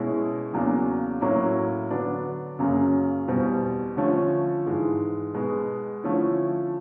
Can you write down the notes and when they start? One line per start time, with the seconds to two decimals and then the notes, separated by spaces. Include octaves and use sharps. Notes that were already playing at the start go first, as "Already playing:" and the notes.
Already playing: B2 G#3 C#4 E4
0.53 E2 C#3 F#3 A#3 D4
1.21 A2 F#3 A#3 C#4 E4
1.91 D3 F#3 B3 D4
2.59 F#2 C#3 F#3 A#3
3.28 E2 B2 G3 C4
3.97 D3 F3 A3 C#4
4.66 G#2 E3 G#3
5.34 B2 G#3 B3
6.04 D3 F3 A3 C#4 E4